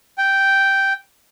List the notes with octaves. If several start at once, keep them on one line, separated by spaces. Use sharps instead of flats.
G5